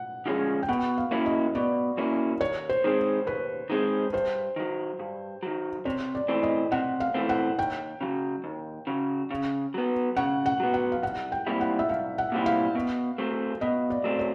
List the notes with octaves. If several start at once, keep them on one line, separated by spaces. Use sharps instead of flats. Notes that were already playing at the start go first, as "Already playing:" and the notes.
Already playing: F#5
D3 F3 G#3 C#4
G5
B2 F#5
F5
F#3 A#3 C#4 E4
D#5
B2 D5
F#3 A#3 C#4 E4
D#2 C#5
C5
D#3 G#3 C4
D#2 B4
D#3 G#3 C4
G2 C5
D#3 F#3
G2
D#3 F#3
C3 C#5
D5
E3 A3 C4
D#5
C3 F#5
F5
E3 A3 C4
F#5
D#2 G5
C#3 F#3
D#2
C#3 F#3
C#3
F#3 B3
C#3 F#5
F#5
F#3 B3
F#5
F5
C2 F#5
G5
A#2 G3 C4 E4
F#5
E5
C2 F5
F#5
A#2 G3 C4 E4
F5
B2
F#3 A3 C4
B2 D#5
D5
F#3 A3 C4
C#5